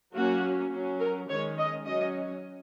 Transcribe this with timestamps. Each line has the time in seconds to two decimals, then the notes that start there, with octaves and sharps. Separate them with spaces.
0.14 F#3 A#3 C#4 F#4
0.72 F#3 C#4
0.99 A#4
1.28 D#3 G#3 C#4 C#5
1.58 D#5
1.85 F#3 C#4 D#5